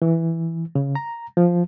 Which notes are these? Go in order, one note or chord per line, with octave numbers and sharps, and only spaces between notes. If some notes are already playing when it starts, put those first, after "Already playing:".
E3
C#3
A#5
F3